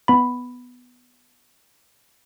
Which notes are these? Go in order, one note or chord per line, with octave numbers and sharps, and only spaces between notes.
B3 B5